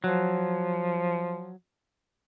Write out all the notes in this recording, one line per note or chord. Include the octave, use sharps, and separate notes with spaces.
F3 F#3